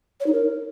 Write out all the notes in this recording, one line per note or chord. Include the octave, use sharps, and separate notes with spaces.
C#5
D#4
A#4